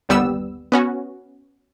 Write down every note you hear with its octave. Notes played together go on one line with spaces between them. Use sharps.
G1 D#2 G3 B3 E6
B3 C#4 F#4